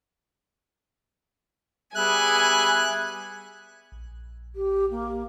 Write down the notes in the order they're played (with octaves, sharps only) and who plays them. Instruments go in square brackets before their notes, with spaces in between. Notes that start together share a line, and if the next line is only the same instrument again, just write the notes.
[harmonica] G3 B3 E5 [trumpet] G#4 [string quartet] G#5 [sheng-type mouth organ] F#6
[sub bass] A#1
[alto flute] G4
A#3